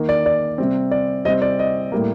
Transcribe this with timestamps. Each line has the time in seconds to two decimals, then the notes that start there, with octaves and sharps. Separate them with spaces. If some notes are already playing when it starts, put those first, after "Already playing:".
Already playing: D#3 A#3
0.09 D5
0.26 D5
0.58 C3 G3 C4
0.91 D5
1.25 C3 G3 C4 D#5
1.42 D5
1.59 D#5
1.92 A2 G3 A#3